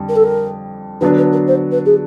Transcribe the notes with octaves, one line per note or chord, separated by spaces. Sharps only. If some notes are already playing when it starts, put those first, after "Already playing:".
Already playing: F2 D3 G3
A#4
A4
A#4
D3 F#3 B3 D4 B4
B4
A#4
C5
B4
G#4